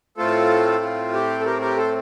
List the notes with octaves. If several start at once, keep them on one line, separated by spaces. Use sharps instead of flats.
A2 A3 C4 F4 A4
F4
G4
A4
G4 A#4
G4 A#4
A4 C5